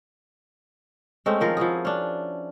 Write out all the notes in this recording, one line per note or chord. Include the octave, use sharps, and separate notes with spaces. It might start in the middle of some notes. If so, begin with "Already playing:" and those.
G#3 A3 C4 C#4
D#3 F3 A#4
F3 E4 F#4 G#4
C#4 D4